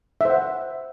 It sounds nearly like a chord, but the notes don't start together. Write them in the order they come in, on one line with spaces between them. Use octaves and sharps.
E5 C5 F#5